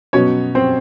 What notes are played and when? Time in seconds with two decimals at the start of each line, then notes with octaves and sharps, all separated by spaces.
0.13 B2 F#3 B3 C#4 C#5
0.55 C4 C5